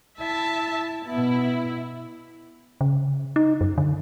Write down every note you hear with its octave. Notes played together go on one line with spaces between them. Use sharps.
E4 E5 A5
B2 B3 E4
C#3
D#4
F#2
D3